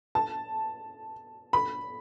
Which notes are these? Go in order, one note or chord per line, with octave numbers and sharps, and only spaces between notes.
A5
B5